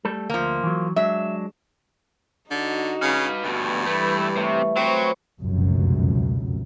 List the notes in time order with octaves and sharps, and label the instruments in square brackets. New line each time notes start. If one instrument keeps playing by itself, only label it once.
[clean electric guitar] G3 A3 A4
[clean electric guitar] D2 [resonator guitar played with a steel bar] F3 A#3
[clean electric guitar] E3 F#3
[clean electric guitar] F#3 G#3 D4 [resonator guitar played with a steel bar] E5
[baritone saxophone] D3 [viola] D#4 F#4
[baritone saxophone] C#3 [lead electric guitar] B4 F5
[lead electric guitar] D2 B2 [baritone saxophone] G2
[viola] E3 G3 [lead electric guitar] A3 [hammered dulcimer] B4
[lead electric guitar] C3 [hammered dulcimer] A3 C#5
[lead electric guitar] F#3 [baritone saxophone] C4 [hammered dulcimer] B4 C5 B5 [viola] C#6
[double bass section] F1 C#2 F#2 B2